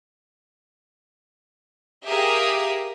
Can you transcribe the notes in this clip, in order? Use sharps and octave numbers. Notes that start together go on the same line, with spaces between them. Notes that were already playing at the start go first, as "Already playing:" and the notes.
G4 G#4 A#4 E5 F5 D#6